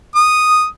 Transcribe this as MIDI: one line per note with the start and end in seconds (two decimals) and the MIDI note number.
0.15 0.65 87